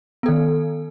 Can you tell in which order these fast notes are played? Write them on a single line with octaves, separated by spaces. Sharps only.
B3 A4 D#3